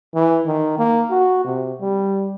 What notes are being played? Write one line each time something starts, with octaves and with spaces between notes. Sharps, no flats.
E3
D#3
A#3
F#4
C3
G3